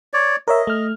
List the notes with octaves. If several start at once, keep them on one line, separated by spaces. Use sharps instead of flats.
C#5 D5
A#4 C#5 D#5 E5
A3 F6